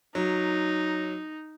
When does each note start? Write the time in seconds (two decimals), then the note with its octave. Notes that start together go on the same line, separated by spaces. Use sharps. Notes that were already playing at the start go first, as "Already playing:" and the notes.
0.15 F#3 D#4